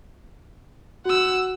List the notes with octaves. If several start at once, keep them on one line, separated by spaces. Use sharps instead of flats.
F#4 F#5 E6